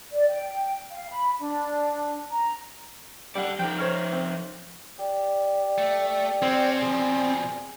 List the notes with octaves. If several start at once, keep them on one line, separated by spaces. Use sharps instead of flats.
D5
G5
F5
B5
D4
A#5
G3 D5 F#5
F3 D#4 G5
C5 C#5 F6
C4
G4 D5
A3
C4 C#4 F#4
B2 F3 G#4